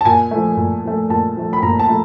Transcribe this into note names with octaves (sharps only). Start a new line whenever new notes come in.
A5
A#2 G#5
F3 A3
A#2
F3 A3
A#2 A5
F3 A3
B5
A#2 A#5
A5
F3 A3